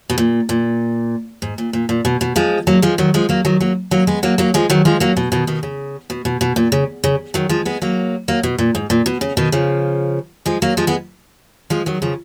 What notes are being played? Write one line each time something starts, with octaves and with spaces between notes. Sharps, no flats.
B2
A#2
A#2
G#2
A#2
A#2
A#2
B2
B2
F3 G#3
F#3 A#3
F3 G#3
D#3 F#3
F3 G#3
F#3 A#3
D#3 F#3
F#3 A#3
F#3 A#3
G#3 B3
F#3 A#3
F#3 A#3
F3 G#3
D#3 F#3
F3 G#3
F#3 A#3
B2
B2 D#3
B2 D#3
C#3
B2
B2
B2
A#2
C#3
C#3
D#3 F#3
F3 G#3
G#3 B3
F#3 A#3
F#3 A#3
B2
A#2
G#2
A#2
B2
C#3
B2 D#3
C#3 F3
F3 G#3
F#3 A#3
F3 G#3
G#3 B3
F3 G#3
D#3 F#3
C#3 F3